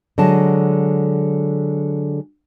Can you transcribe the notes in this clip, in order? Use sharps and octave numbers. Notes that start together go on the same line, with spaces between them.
D3 F#3 G#3 A5